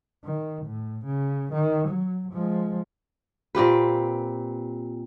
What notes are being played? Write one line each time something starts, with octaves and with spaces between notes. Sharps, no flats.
D#3
A2
C#3
D#3
F#3
F3 G#3
A#2 C4 G4 B4